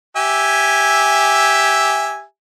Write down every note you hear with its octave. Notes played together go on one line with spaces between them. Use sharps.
G4 E5 G#5